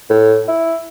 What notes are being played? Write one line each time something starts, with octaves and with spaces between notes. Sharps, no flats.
A2
E4